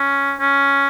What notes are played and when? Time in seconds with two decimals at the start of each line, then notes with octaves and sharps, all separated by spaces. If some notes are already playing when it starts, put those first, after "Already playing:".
Already playing: C#4
0.40 C#4